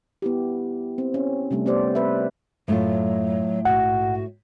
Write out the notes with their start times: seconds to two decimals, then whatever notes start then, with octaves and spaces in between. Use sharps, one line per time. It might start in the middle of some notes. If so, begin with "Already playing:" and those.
0.22 B3 E4 G4
0.98 C4
1.14 C#4
1.51 C3 G3 A3 D4
1.66 B3 G4 C5 D5
1.95 B4 E5
2.68 F#2 A2 F#3 A3 F4
3.65 A#1 G#2 F#4 F#5